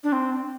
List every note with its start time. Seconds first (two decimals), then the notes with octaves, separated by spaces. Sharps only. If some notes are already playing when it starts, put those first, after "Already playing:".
0.04 D4
0.12 C4